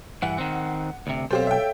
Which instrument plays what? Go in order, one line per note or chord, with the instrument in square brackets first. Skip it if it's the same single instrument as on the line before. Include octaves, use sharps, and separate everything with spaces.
[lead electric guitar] G2 E3 [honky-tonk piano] F#5
[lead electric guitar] D#3 C4
D2 C3
[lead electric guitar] B1 [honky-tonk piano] C4 G4 C5 [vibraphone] A4 C#5 F5
[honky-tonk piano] E5 G5